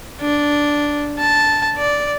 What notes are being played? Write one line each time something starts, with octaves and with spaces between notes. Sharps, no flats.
D4
A5
D5